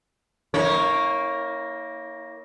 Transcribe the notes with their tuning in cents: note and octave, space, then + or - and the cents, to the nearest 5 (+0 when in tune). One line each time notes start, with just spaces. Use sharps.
A#3 +0 E4 -40 C#5 +0